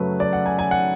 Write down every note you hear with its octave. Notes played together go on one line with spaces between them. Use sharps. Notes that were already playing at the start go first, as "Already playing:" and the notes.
Already playing: F#2 C#3 F#3 A3 B4
D5
F#5
G#5
G#5
F#5